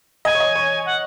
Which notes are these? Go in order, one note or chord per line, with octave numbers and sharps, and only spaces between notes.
D#5 G#5
C#5
D#5
C#5
F#5